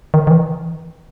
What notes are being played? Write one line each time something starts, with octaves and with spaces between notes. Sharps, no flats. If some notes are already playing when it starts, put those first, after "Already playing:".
D#3
D#3
E3